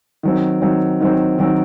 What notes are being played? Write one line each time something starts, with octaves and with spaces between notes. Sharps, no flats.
D#3 F#3 C4
D#3 F#3 C4
D#3 F#3 C4
D#3 F#3 C4